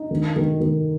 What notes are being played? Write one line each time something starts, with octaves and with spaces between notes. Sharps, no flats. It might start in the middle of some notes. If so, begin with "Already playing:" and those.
Already playing: D#4
D#3
D#3
D#3